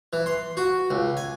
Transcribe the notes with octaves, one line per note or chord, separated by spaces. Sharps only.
E3
C6
F#4
C#2
G#5